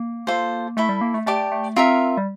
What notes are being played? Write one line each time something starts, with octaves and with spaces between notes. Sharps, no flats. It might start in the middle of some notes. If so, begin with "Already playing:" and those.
Already playing: A#3
F4 A4 C5
A3 E4 A4 E5
G3
A#3
A3
A3 G4 D5 A5 D6
A3
C4 F4 A#4 E5
G3